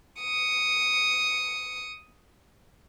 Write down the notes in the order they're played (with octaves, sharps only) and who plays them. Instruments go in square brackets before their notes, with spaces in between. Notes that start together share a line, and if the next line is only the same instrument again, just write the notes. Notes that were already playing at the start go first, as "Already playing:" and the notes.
[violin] D#6 C#7